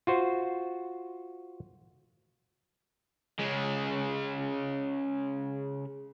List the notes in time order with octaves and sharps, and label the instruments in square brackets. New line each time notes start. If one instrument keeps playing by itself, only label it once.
[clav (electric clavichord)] F4 F#4 C5
[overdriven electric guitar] C#3 G#3